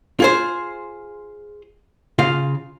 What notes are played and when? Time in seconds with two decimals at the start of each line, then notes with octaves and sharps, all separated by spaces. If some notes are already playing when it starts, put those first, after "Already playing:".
0.20 F4 G#4 C5
2.19 C#3 F4 F5